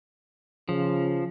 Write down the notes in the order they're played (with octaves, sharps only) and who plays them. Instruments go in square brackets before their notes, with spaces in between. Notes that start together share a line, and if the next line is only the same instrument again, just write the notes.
[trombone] C#3 [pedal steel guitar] F3